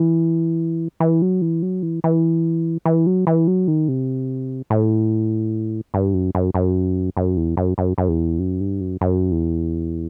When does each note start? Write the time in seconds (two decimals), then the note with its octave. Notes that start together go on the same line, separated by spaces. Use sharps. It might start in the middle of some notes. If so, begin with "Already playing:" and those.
Already playing: E3
1.00 E3
1.22 F#3
1.42 E3
1.62 F#3
1.83 E3
2.04 E3
2.85 E3
3.07 F#3
3.27 E3
3.47 F#3
3.68 D#3
3.88 C3
4.70 A2
5.94 G2
6.14 F#2
6.35 F#2
6.54 F#2
7.17 F#2
7.37 E2
7.57 F#2
7.78 F#2
7.98 F#2
8.09 E2
8.39 F#2
8.61 G2
8.81 F#2
9.01 F#2
9.31 E2